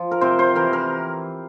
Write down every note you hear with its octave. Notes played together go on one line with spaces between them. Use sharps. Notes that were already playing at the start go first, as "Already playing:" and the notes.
Already playing: F3
A#4
C3 C5
C5
E3 A#4
A#4